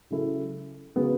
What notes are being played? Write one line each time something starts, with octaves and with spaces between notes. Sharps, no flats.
C#3 F#3 C#4 E4 A4
C#3 F#3 B3